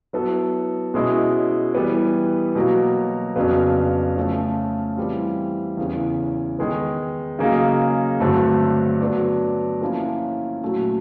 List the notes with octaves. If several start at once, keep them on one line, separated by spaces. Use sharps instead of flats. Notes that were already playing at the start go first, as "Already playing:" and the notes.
F#3 B3 E4 A4
B2 G#3 C#4 E4
E3 G3 B3
B2 F#3 A#3
F2 C#3 F#3 B3 D4
C#3 F3 A3 C#4
E3 G3 C4 F4
E2 C#3 E3
D#3 G#3 B3
C#3 F#3 A#3 D#4 G#4
G2 D3 F#3 A3 C4
F#3 B3 D4
F3 A#3 C#4 E4
A#2 F#3 A3 C#4